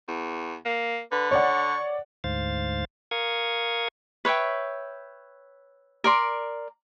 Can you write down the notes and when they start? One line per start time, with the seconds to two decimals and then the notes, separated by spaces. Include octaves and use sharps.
0.08 E2
0.65 A#3
1.12 D3 B4
1.31 C#5 D5 F#5 C#6
2.24 D2 G#2 C5 F5 A6
3.11 A#4 F5 C#6 D#6 G#6
4.25 B4 C#5 E5 G5
6.04 A#4 D5 C6